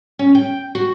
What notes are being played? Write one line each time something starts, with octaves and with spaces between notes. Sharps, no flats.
C#4
G5
F#4